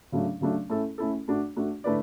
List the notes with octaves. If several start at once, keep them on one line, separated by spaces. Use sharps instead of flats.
C#3 F#3 A3 D4
C#3 F#3 A3 D4
A3 C#4 E4 A4
A3 C#4 E4 A4
A3 D4 F#4
A3 D4 F#4
D3 A3 E4 B4 D5